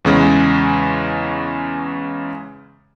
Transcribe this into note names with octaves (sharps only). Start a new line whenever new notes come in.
E2 C#3 G#3